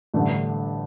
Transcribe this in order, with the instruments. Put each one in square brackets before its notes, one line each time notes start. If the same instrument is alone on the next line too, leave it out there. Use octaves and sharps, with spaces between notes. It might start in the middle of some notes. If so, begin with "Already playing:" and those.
[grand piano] A1 G2 D3 A3 D4